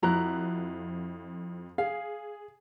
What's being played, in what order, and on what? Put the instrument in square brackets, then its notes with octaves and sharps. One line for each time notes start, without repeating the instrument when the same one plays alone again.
[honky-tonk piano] F2 F3 F#6 [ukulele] E4 F#4 A#5
[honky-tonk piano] G#4 [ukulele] F5